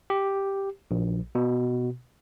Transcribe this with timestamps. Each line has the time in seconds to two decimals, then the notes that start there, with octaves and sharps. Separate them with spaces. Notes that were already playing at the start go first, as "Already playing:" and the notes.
0.10 G4
0.91 A#1
1.35 B2